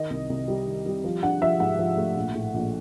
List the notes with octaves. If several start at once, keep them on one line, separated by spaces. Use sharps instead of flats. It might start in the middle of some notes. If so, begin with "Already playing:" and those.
Already playing: D#3 D#5
C2
C2
G3
D#3
G3
F3
D4 F#5
F3 E5
G#2 F#5
F3
A3
A#1
A2
A#1